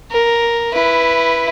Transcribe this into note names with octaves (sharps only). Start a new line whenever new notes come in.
A#4
E4 B4